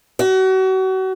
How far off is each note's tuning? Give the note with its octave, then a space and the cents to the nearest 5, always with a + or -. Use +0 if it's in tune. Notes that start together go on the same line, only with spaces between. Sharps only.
F#4 +35